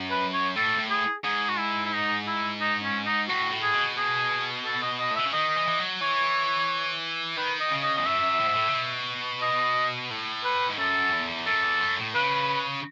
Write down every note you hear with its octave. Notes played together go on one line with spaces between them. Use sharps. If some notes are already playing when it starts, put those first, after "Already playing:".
Already playing: F#2
B4
C#5
A2 A4
A2
G#4
G#2 G#4
F#4
E4
E4
D#4
E4
D#4
C#4
D#4
A2 F#4
A2
G#4
B2
G#4
A4
D#5
D#5
A2
B2 E5
C#3
D#3 D#5
E3
E3
F#3
E3 C#5
D#3 B4
D#5
C#3
D#5
E2 D#5
F#2 E5
A2
G#2
A2
C#3
B2
D#5
A2
B4
G#2
F#2 A4
E2
F#2 A4
E2
F#2
A2
C#3 B4